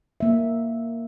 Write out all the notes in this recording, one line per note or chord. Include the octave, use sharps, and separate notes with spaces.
A#3 E5